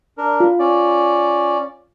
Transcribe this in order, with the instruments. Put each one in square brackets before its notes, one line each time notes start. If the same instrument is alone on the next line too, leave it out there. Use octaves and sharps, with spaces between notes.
[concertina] D4 A#4
[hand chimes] F4
[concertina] C#4 D5